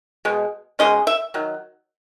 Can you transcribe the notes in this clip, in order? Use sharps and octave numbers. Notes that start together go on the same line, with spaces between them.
B2 G#3
B2 G#3 C#4 D#5
E5
D#3 F#3